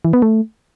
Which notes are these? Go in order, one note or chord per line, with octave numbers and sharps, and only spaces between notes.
E3
B3
A3